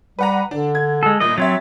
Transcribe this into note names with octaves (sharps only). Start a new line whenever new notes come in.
G3 B4 F#5 A#5
D3 D4
G#6
G#3 A4
G1 A#2 D#5
F#3 C4 E5 G#6 A6